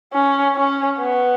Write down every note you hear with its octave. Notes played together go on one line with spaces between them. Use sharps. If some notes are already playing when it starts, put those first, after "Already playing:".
C#4
C#4
B3